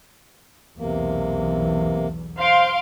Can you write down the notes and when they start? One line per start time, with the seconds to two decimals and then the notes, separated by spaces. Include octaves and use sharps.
0.78 B1 E2 C3 A#3
2.39 C5 F5 C6 D7